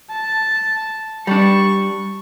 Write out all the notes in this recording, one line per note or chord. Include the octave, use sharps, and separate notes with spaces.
A5
G3 D4 C#6